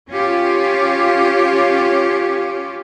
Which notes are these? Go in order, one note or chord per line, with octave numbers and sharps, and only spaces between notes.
C#4 F4 G4